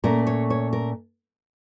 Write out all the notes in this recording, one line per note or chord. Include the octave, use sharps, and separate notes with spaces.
A#2 A3 C#4 A#4
C#5
C#5
A#4